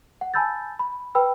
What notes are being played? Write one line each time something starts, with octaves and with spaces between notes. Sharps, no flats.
F#5
G#5 A5 B5 E6 G6 A6
B5
B4 G5 B5 E6